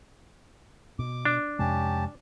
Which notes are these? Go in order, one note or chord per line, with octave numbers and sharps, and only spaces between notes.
B2 D6
D4
F2 C3 G#3 C#4 G4 A5